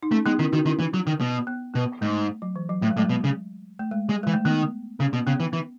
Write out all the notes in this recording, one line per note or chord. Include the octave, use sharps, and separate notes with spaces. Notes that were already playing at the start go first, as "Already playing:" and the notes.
D#4
A3 C#4
G#3 B3 D#4
D#3 C#4 E4
D#3 D#4 F#4
D#3 C#4 E4
E3
F#3
D#3
B2
B3
B2 B3
G#2 A3
F#3
E3
F#3
A2 A3
G#3
A2 F#3
B2 G#3
C#3
A3
G#3
G#3
E3 G#3
A3
D#3 B3
C#3 C#4
B2
C#3 B3
E3
E3